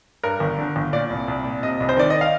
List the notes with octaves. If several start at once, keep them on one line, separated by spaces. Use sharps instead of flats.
G2 A#4
G1
D3
G1
A#2 D5
C2
C2
A#2
C3 D#5
C2
C5
D#3 D5
D#5
F5